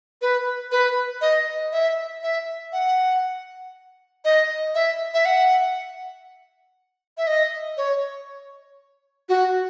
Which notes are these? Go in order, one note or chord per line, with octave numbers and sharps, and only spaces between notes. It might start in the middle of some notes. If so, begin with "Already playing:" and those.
B4
B4
D#5
E5
E5
F#5
D#5
E5
E5
F#5
E5
D#5
C#5
F#4